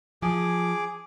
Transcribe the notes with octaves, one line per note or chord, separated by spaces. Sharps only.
F3 G#4 D6